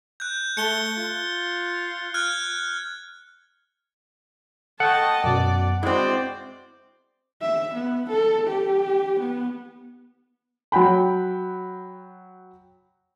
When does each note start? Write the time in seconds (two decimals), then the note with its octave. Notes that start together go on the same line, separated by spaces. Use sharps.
0.20 F#6 G6
0.57 A3 C#7 G7
0.97 F4
2.14 F6 F#6 G#6
4.80 A4 D#5 F#5 G5 A5 C#6
5.24 F#2 B2 D5
5.83 G#3 C4 E4 F#4 C5 D5
7.41 E5
7.74 B3
8.10 A4
8.47 G4
9.20 B3
10.72 F#3 F#5 G5 B5